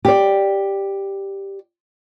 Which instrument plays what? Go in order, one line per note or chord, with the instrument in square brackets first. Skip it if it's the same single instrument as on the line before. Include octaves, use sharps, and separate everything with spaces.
[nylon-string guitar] G4 D5